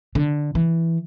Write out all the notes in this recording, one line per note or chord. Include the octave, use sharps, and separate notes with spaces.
D3
E3